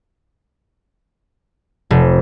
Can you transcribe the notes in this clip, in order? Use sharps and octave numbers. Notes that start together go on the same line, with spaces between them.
F1